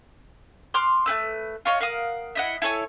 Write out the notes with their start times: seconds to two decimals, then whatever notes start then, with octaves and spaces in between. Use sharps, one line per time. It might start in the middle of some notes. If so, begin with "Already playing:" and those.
0.74 C6 D6 F6 F#6
1.06 A3 C4 B4 E6
1.65 F4 C#5 D#5
1.80 A#4 F5 F#5 D#6
2.35 E4 D#5 F#5
2.62 E4 A4 C#5 G#5